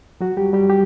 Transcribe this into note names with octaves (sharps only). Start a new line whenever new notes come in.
F#3 F#4
G3 G4
G3 G4
G4